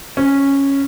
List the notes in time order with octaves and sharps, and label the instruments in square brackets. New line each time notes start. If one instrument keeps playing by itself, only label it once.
[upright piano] C#4